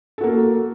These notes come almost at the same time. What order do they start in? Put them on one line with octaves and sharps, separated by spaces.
A4 F#4 A#3